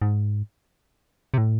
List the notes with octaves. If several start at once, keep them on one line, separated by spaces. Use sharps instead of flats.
G#2
C3
A2